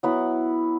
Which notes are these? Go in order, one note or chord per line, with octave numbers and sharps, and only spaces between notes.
F#3 B3 E4